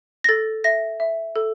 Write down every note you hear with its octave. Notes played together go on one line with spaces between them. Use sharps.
A#6
A4 A6
E5 A#6
E5
A4